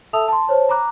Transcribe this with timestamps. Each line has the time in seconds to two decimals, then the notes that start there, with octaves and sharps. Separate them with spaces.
0.13 A4 E5 A5 D#6 E6 F7
0.28 A5 C6
0.47 C5 C#5 A5
0.69 A#5 B5 D6 F#6